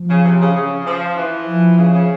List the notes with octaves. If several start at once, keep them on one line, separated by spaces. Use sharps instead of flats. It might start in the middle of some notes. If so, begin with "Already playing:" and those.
Already playing: F3
C#3
C3
C#3
C#3
F3
E3
F3
C#3
C#3